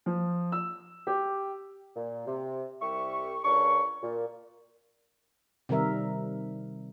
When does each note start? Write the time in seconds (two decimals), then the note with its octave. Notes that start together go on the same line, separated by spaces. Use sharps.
0.06 F3
0.52 E6
1.07 G4
1.96 A#2
2.27 C3
2.82 C2 G4 E5 C#6
3.45 C#2 D4 A#4 C#5 C#6
4.03 A#2
5.69 C3 D#3 G3 A#4 E5